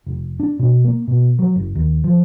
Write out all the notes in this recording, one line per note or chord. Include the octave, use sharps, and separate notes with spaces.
F1
D4
B2
A#3
B2
F#3
F#1
D#2
F3